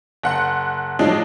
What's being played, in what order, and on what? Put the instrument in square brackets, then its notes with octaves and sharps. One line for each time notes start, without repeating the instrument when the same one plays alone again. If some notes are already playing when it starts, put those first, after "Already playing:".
[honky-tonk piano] F#1 F#5 C6
A2 F3 F#3 G#3 D4 D#4